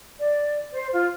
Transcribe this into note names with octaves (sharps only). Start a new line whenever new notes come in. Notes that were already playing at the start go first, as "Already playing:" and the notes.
D5
C5
F4